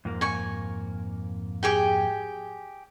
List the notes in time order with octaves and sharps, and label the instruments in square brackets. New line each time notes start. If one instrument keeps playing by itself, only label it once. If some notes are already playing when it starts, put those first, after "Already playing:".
[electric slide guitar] F2 G#2 A#3
[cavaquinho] G#5 C#6
G4 G#4 G5